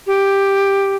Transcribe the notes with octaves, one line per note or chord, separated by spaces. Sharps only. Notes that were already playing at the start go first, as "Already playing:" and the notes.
G4